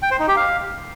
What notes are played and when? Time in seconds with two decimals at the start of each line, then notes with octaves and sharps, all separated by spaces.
0.02 G5
0.11 C5
0.19 D#4
0.28 G4
0.36 F5